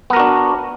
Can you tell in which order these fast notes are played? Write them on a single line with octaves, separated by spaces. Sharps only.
B3 A#4 F#4 D4